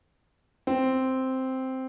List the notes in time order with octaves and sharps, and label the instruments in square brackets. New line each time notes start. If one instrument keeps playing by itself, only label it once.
[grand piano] C4